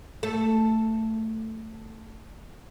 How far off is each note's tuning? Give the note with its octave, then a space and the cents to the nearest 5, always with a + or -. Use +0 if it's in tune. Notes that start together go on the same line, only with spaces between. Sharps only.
A3 +10 A4 +0